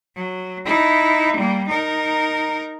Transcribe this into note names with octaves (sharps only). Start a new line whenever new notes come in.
F#3
D#4 E4
G3 A#3
D#4 A#4